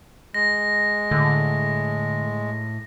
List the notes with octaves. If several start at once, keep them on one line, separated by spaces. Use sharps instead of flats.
G#3 A#6
A2 D3